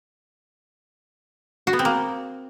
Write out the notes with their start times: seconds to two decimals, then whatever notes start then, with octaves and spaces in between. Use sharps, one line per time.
1.67 F#4
1.73 B3
1.79 C4
1.85 A#3